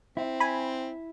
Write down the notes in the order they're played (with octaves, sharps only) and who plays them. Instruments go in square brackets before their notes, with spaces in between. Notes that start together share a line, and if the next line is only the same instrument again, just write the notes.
[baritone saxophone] C4 [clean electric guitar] E4
[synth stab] G#5 B5